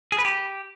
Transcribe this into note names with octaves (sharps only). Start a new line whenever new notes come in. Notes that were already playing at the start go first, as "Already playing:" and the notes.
G#4
B4
G4